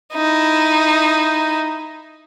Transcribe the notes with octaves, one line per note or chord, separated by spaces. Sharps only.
D#4 E4